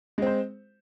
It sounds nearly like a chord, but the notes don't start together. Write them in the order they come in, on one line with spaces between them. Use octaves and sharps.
G#3 C4 C5